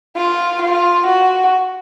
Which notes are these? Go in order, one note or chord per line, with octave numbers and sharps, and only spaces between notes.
F4
F4
F#4